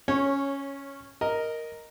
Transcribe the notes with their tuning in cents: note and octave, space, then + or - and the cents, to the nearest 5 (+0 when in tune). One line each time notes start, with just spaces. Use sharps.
C#4 +0 C#5 -15
A#4 +0 D#5 +0